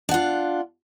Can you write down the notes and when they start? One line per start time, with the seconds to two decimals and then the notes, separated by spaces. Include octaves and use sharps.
0.09 D4
0.11 F#5
0.14 F4